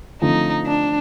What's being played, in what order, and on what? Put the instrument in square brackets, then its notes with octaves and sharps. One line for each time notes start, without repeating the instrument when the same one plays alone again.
[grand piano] D3 F3 A3 C4 [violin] D#4
[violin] D4